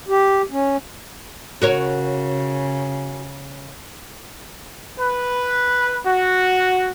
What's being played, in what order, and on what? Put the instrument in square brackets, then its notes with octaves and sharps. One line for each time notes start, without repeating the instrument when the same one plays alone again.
[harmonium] G4
C#4
[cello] C#3 [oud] F#4 A#4 C#5
[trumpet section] B4
F#4